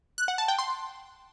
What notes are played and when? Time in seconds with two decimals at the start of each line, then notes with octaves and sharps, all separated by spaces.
0.18 F#6
0.28 F#5
0.38 A5
0.48 G5
0.59 C6